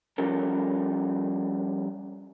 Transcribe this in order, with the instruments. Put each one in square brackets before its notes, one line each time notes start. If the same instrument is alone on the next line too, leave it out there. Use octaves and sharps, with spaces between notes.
[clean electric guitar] F3 G3 C#4 A4 A#4